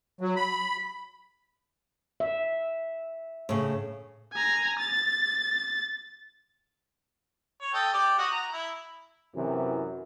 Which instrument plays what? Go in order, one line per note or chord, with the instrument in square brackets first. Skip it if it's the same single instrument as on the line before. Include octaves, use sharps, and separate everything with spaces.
[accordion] F#3
B5
[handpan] E5
[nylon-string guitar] A2 C#3
[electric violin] G#5 A#5
A6
[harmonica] C#5
A4 D#5 G5
G4 D5
F#4 D#5
A#5
E4
[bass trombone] F#2 [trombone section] C3 E3